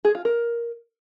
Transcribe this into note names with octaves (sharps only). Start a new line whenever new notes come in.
G#4
F4
A#4